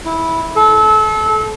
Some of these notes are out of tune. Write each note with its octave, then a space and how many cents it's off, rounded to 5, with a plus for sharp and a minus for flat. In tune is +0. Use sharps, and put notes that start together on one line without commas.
E4 -15
A4 -30